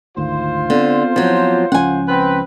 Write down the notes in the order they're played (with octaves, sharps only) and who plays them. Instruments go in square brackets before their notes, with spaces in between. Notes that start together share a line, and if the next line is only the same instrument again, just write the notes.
[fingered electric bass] G#1 D2 D#3 [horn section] F4 C5
[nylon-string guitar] D3 [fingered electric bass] B3 C4
[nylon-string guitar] F3 F#3
[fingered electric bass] C#2 F3 C#4 [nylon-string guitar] F#5 G#5
[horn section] C4 B4